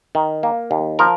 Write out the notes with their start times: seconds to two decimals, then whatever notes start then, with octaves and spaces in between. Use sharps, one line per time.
0.15 D#3
0.43 A#3
0.71 D#2
0.99 F3 A#4